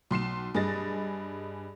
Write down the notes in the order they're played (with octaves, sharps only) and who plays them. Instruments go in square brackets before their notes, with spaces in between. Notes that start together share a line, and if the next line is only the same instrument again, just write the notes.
[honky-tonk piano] B1 C6 C7 E7
G2 G#4 D#5 A6 A#6